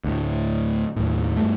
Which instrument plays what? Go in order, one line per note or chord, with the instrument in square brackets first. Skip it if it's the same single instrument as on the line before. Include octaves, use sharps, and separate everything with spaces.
[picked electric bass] D2 A2
D#2 A2
G2 A3